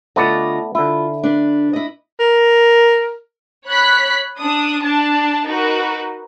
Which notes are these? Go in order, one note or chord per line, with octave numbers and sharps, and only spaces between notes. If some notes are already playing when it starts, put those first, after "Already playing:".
D3 A3 B3 F4 D5 D#5
D3 E4 F4
D4 B4
E4 D#5
A#4
C#5 B5 F#6 B6
D4 D#6
D4 A5
D#4 F#4 A#4 B4